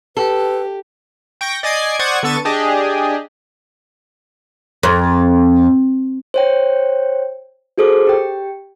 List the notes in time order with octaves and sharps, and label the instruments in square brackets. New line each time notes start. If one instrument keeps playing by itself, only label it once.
[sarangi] G4 [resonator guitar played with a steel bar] A4 [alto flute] B4
[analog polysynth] G5 C#6 G6 A#6
D5 D#5 G#5 D6 G#6 C7
C5 D5 F#5 C#6 D#6 G#6
D3 B3 A4 C#6 A6 D#7
D4 G4 G#4 D#5
[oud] F2
[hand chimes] C5 C#5 G5
F#4 G#4 A4 C5 D6
G4 G5